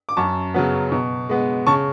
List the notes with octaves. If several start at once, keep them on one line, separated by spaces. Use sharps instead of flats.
D6
F#2 A5 C#6
C#3 F#3 B3
B2
G#3 B3
C#3 A5 C#6